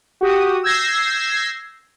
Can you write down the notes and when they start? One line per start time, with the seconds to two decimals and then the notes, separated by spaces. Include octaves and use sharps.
0.21 F#4 G4 D#6
0.63 E6 G6 G#6 A#6 C7